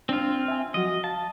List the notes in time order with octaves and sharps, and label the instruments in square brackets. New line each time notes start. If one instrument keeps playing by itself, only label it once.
[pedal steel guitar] C4 F4 [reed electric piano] D4
[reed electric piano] E5 G#5
[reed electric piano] F3 F#3 F#4 [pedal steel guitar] D#5
[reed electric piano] F5 [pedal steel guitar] A5